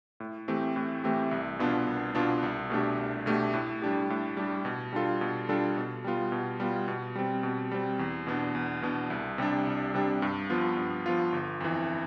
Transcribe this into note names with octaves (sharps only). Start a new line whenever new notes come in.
A2
E3 A3 C4 G4
A2
E3 A3 C4 G4
C2
B2 B3 D4 F4
C2
B2 B3 D4 F4
C2
B2 A3 D4 G4
C2
B2 A3 D4 G4
A2
G3 D4 G4
A2
G3 D4 G4
B2
G3 D4 F4 A4
B2
G3 D4 F4 A4
B2
G3 B3 F4
B2
G3 B3 F4
B2
G3 C4
B2
G3 C4
E2
B2 B3 D4
E2
B2 B3 D4
C2
C3 G3 D4
C2
C3 G3 D4
G2
F3 B3 F4
G2
F3 B3 F4
G1
F2 E3